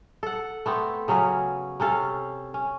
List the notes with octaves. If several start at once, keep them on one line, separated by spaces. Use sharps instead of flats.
A4 F#5
A3 B3 C4
C#3 F#3 C#4 G#4
C3 C#4 A4 F5
C#4